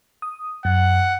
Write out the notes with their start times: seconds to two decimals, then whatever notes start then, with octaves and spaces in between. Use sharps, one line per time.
0.22 D#6
0.65 F#2 F#5